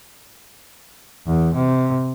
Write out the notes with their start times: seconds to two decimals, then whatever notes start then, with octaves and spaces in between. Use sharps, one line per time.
1.26 E2
1.55 C3